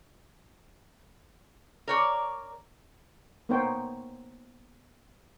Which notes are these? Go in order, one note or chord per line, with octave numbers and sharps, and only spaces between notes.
A#4 C#5 D5
A#3 B3 D#4 C5 C#5 G5